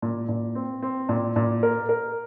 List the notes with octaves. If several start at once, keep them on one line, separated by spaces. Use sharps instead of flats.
A#2
A#2
C4
C4
A#2
A#2
A#4
A#4